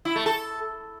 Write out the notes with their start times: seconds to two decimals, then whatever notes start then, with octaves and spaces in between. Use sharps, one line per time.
0.05 E4
0.16 A3
0.26 A4